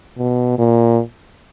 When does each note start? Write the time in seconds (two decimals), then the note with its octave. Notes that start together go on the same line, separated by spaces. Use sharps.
0.18 B2
0.58 A#2